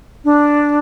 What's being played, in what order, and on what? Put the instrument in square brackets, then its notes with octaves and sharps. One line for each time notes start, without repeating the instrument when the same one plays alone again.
[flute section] D4